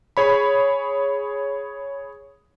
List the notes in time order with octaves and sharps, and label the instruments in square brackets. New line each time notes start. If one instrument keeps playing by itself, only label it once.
[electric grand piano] G#4 C#5 B5